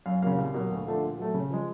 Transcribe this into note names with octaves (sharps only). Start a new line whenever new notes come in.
F#2 F5
C#3 F#3 A#3 F5
C2
B2 F#3 A#3
D2
D3 F3 A3 D4
A#2
F#3 A3
C#3
F3 G#3